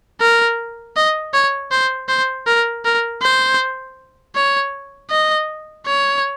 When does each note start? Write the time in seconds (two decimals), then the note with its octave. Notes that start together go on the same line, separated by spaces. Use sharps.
0.21 A#4
0.96 D#5
1.34 C#5
1.72 C5
2.09 C5
2.47 A#4
2.85 A#4
3.22 C5
4.36 C#5
5.10 D#5
5.86 C#5